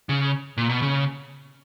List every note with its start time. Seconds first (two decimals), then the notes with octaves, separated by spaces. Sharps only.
0.09 C#3
0.58 A#2
0.69 B2
0.82 C#3